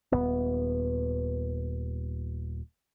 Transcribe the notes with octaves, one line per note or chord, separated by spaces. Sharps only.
D#1 F2 B3